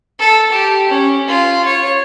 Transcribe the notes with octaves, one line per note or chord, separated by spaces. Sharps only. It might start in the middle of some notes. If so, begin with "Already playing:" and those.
A4
G4
C#4
F4
C#5